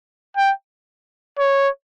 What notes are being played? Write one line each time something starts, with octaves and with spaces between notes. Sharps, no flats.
G5
C#5